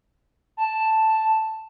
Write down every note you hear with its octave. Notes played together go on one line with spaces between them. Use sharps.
A5